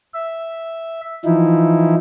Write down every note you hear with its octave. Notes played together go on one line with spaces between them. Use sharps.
E5
E3 F3 D#4 E4